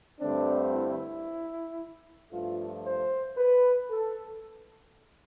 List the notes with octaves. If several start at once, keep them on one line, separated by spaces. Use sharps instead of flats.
G2 D3 A3 C4 D4
E4
G2 F3 A3 F4
C5
B4
A4